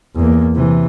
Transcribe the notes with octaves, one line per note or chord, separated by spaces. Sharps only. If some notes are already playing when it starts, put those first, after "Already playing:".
E2 A#3
C3 E3